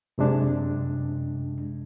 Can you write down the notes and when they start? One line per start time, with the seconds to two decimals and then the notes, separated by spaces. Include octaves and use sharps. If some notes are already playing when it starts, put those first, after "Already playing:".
0.18 F#2 C3 G#3 D4